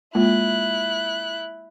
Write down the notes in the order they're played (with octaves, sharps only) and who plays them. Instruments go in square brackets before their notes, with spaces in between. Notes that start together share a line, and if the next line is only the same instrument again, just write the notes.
[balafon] G#3 A#3 F4 [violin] E4 F#6